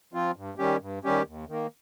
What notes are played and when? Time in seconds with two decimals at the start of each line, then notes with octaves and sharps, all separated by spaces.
0.13 F3 C4 F4
0.36 G2
0.58 D#3 G3 C#4 G4
0.81 G2
1.04 D#3 G3 C#4 G4
1.27 D#2
1.49 D#3 A#3